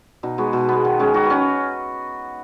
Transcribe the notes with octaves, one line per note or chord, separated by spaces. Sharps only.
B2 D#4
G#3 B3 F#4
B2
G#3 B3
D#3
G#3 C#4
D#3 F#4
C#4 B4